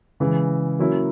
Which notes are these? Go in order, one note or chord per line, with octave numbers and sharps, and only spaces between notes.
C#3 E3 G#3
F#3 A#3 C#4 E4